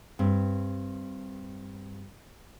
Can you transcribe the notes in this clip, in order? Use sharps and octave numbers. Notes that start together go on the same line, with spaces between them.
G2 C4